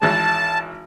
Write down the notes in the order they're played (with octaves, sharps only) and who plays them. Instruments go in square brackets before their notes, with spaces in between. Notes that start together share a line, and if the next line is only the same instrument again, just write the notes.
[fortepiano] G#1 E3 G#3 [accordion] A5